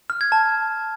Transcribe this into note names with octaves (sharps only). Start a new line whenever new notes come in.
F6
G#6
A5